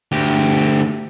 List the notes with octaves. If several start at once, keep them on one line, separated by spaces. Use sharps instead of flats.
D2 G4